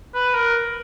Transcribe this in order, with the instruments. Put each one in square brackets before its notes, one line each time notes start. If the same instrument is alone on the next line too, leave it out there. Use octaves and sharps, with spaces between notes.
[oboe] B4
A#4